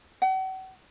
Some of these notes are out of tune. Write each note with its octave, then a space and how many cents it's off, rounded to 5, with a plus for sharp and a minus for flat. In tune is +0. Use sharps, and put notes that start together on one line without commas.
F#5 +40